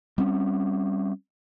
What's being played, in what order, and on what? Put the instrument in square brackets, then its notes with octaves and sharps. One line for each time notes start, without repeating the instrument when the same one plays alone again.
[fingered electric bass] G3 C4 C#4